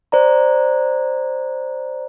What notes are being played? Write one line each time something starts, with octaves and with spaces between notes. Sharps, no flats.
C5 D5 A#5